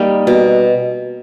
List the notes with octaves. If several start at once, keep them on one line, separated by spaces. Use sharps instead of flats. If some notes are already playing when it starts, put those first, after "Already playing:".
Already playing: G3 A#3 D#4
B2